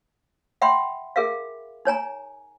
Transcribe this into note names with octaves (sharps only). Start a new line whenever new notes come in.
E5 F#5 G5 B5 C6
G#4 A#4 E5 F5
D#4 C#5 G#5 A#5